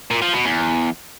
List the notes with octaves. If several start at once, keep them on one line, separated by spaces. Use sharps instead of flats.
A#2
F3
B2
E2